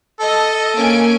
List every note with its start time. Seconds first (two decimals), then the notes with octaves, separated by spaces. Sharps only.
0.20 A4 D#5
0.77 A#3 C#4 G#5 D7